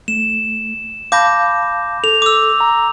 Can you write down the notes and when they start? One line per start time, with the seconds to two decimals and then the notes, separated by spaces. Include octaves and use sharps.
0.08 A3 E7
1.12 F5 A5 B5 D6 G6 A#6
2.04 A4 F7
2.22 D6 E6
2.60 A#5